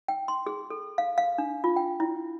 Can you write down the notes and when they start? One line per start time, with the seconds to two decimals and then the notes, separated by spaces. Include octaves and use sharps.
0.08 G5
0.28 C6
0.46 G#4
0.70 A4
0.98 F5
1.18 F5
1.38 D4
1.64 F4
1.76 G5
2.00 E4